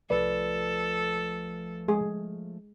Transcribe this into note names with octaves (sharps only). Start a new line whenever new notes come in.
C2 F3 A3 A4 B4 D5
G#3 G#4